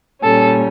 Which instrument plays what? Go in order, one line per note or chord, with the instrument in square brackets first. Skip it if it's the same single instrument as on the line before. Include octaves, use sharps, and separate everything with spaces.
[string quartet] A#2 G3 C#4 A4